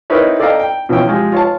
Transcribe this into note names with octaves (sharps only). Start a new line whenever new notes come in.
C4 D#4 E4 A#4 B4 C#5
A4 D5 D#5 F5 G5 A#5
G5
B2 E3 F3 C#4 G5
F3 G#3 G4
F4 C#5 A5